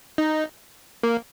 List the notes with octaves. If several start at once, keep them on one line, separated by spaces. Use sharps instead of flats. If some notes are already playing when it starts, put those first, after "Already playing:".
D#4
A#3